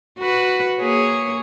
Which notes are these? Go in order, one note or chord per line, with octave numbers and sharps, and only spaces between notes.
F#4 B4
A#3 G#4 C#5